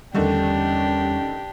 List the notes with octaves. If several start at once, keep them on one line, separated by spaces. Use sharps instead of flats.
E2 D3 D#3 G3 A3 C#4 D4 G4